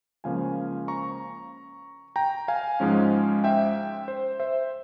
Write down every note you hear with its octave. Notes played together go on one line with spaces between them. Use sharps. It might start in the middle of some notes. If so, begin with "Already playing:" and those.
C#2 C#3 F3 A#3 C#4 F5 G#5
A#5 C#6
G5 A#5
F5 G#5
G#2 F3 G#3 C#4
E5 G5
C5
C5 E5